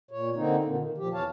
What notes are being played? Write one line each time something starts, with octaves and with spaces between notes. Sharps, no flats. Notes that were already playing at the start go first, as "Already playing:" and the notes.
A#2 C#5
D3 A#3 C4 D#4
A#2 D3 D#3
D#3
A#2 F3 G4
E2 E3 C#5 F5 A5